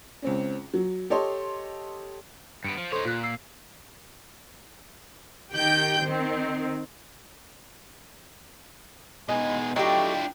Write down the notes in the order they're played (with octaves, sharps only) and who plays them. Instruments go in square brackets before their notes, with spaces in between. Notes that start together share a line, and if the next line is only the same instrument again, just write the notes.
[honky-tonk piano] C#2 C4 C#4
F#3
G4 A4 C#5 D#5 C6
[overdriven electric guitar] G2 B3 [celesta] C#7 D7
[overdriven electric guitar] F3
[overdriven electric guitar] D#4 C#5 [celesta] A4 C5 C6
[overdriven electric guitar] A#2 [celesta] F4 F#6
[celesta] E6 C7
[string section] D#3 G4 G5 G6
D#3 C4
[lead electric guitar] B2 G#3 [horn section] B3 D#4 G#5 [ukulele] G#4 D#5
[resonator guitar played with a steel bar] F#3 A3 G4 [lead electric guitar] D4 E4 [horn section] F4 G5 [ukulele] D#5